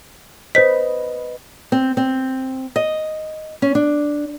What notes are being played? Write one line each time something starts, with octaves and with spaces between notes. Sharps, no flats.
B4 C5 D#5 B6
C4
C4
D#5
C#4
D4